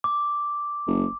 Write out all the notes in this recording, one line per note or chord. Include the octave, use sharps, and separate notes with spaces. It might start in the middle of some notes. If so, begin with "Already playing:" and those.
D6
F#1